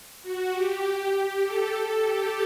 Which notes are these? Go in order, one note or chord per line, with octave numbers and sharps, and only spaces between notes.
F#4
G4
G4
A4
G4